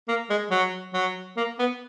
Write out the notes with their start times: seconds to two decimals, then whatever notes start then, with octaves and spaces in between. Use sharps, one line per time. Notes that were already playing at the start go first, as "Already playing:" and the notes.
0.08 A#3
0.30 G#3
0.51 F#3
0.93 F#3
1.37 A#3
1.59 B3